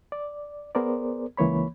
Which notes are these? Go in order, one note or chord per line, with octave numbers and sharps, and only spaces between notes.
D5
B3 G#4 A#4 C5 D5
C#2 E3 A#3 C#5 B5